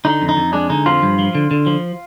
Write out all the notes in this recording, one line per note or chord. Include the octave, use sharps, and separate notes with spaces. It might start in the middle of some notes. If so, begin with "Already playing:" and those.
D3 D#4
F2
D#4
F2
G#3 D4
D3 D#4
F2 F3 F4
G2
F3
D3
D3
F3